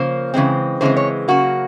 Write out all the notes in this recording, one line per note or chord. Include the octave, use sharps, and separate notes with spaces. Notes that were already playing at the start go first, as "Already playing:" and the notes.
Already playing: C#3 F3 A#3 C5
C#3 E3 G#3 C4
C#3 E3 G#3 C4 C5
C#5
C#3 F#3 A#3 F#4